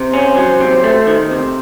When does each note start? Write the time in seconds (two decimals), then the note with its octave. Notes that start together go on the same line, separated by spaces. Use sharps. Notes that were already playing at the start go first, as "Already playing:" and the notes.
Already playing: C3 C5
0.13 C#4
0.37 F#3
0.61 C3
0.84 A3
1.07 D#3
1.31 C3